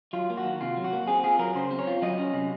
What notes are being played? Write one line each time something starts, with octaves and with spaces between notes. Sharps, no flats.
F#3 F4
A#3
F#4
D#3
C3 F4
F#3
F#4
A#3
C4 G#4
F4 G#4
F#3 A#4
C#3 C5
C4
C#5
F4
F#3 D#5
C#4
C3